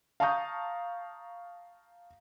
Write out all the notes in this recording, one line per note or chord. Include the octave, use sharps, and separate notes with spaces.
F5 A5 A#5 C#6 D#6 G6